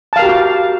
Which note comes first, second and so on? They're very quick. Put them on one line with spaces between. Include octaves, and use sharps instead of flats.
A5 F5 A#4 G4 F#4